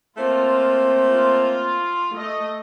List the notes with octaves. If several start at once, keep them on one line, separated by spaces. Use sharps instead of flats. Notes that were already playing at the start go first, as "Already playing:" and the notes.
A3 A#3 C4 F4
F4
A3 D#5